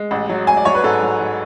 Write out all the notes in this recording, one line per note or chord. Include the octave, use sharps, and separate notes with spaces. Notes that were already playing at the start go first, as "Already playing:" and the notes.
Already playing: G#3
A1
F#3
A1 G#5
D5
F#3 C#5
B4
G#2 A4
F#3
F#3